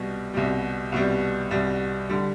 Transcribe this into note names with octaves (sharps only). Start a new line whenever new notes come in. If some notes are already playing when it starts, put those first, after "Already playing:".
Already playing: C2 B2 G3
C2 B2 G3
C2 B2 G3
C2 B2 G3
D3 G3